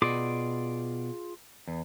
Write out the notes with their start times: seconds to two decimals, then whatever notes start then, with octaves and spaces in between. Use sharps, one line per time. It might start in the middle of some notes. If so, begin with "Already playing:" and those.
0.02 B2 F4 G#4 D5 D6
1.68 E2